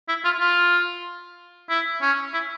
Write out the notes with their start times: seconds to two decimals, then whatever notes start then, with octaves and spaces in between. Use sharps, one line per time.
0.08 E4
0.25 F4
0.40 F4
1.70 E4
2.01 C#4
2.33 E4